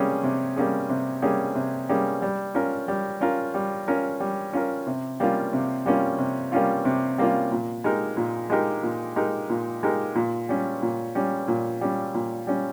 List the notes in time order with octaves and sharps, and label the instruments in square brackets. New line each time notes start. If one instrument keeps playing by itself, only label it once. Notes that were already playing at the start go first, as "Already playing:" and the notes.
Already playing: [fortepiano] C3 G3 A#3 C#4 G#4
C3
G3 A#3 C#4 G#4
C3
G3 A#3 C#4 G#4
C3
G3 A#3 C#4 G#4
G3
C#4 F4 A#4
G3
C#4 F4 A#4
G3
C#4 F4 A#4
G3
C#4 F4 A#4
C3
G3 A#3 C#4 F4
C3
G3 A#3 C#4 F4
C3
G3 A#3 C#4 F4
C3
G3 A#3 C#4 F4
A#2
G#3 D#4 G4 A#4
A#2
G#3 D#4 G4 A#4
A#2
G#3 D#4 G4 A#4
A#2
G#3 D#4 G4 A#4
A#2
G3 C#4
A#2
G3 C#4
A#2
G3 C#4
A#2
G3 C#4